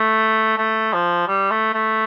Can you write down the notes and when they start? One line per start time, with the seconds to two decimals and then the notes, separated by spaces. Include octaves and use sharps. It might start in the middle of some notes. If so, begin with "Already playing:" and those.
Already playing: A3
0.58 A3
0.94 F3
1.28 G3
1.51 A3
1.74 A3